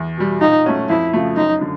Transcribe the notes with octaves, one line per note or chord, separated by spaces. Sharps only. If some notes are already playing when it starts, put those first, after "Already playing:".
Already playing: E2
B2 G3
A#2 D#4
F#3 A3 C#4 F#4
F2 E4
C#3 F3 A3
F#2 D#4
D3